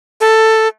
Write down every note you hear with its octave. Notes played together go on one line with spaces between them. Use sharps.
A4